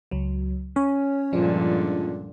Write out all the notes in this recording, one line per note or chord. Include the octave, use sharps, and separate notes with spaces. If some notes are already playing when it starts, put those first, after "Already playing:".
C#2 F#3
C#4 C#5
C#2 G2 A#2 D3 F3 D4